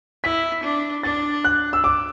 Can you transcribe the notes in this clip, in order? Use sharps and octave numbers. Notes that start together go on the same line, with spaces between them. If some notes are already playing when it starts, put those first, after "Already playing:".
E4 B6
D4
D4 A6
F#6
E6
D6